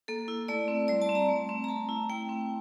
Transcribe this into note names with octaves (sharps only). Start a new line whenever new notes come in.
A#3 A4
E4
A3 D5
C4
G3 D5
A5
C4
A#5
A3
C4
A#5
A3 A5
E4
A3 G5
C4